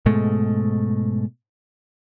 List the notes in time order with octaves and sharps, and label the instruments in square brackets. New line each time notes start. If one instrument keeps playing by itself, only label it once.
[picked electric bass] G#2 B2 G#3 A3